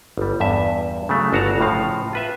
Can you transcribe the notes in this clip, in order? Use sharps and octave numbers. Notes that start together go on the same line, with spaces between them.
G1 G3
E2 G2 E5
C#3 F#3 A3
G1 D4 F#4 F#5 A5 A#5
A2 C#3 F3 F5
F4 B4 E5